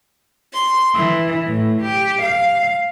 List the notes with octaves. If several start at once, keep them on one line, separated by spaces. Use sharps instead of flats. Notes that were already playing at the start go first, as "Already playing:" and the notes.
C6
E3
A2
G4
F5